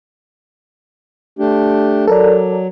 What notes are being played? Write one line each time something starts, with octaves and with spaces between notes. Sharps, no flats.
A3 D4 G4
F#3 A4 A#4 D5